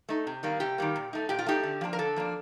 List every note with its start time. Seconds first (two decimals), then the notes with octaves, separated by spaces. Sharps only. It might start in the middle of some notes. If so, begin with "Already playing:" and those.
0.09 A3 D#4
0.27 C3
0.43 D#3 G3 A#3
0.60 C3 G4
0.78 D#3 G3 A#3
0.96 A#2
1.13 A3 D#4
1.29 A#2 G4
1.39 F4
1.46 A3 D#4 G4
1.63 D3
1.81 F3 A#3 D4
1.93 A#4
1.99 D3 A4
2.16 F3 A#3 D4